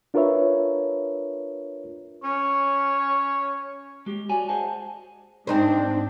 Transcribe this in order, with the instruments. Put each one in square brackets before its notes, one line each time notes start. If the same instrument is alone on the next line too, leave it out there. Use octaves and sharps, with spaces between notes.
[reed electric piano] D4 F4 A#4 B4 C#5 E5
[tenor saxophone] C#4 [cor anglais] C#5
[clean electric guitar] G#3 G4
F#4 C#5 D5 G#5
G#4 C5 D#5 F#5 G#5 A5
[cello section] G#2 D4 [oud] C4 D#4 C5